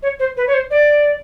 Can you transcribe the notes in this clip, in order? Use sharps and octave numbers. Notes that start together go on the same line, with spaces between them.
C#5
C5
B4
C#5
C5
D5